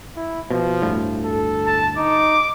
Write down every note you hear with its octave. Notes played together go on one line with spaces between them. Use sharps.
E4
B2 F3
G1 D2 A2
A4
A5
D#4 D6